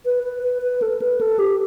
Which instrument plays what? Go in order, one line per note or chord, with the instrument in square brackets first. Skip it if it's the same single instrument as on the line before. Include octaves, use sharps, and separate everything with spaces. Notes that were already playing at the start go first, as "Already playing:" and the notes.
[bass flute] B4
B4
B4
B4
A4
B4
A4
G4